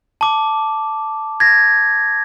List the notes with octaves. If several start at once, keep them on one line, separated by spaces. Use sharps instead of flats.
A5 D6
G#6 A#6